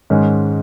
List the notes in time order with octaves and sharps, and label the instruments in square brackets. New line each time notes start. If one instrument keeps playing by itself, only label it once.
[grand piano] G#2 D#3 G#3 C#4